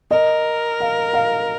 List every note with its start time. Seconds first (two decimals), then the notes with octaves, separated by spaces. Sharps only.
0.11 A#4 D#5
0.80 F5
1.13 F5